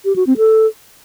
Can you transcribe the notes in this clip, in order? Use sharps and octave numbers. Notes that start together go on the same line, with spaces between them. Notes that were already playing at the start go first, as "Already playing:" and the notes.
G4
F#4
C4
A4